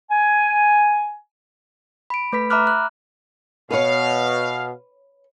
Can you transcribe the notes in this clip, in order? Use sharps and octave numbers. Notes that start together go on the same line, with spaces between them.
G#5
B5 D7
A3 B4 B5 B6
E5 A#5 B5 D6 F6 F#6
F#6
B2 B4 C#5 F5